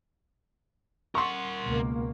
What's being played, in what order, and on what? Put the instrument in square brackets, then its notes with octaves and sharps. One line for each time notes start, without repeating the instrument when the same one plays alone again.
[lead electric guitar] A#4 F#5 [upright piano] C6 C#6
[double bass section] C#2 B2 A#3